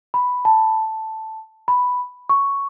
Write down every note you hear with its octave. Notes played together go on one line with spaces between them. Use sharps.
B5
A5
B5
C#6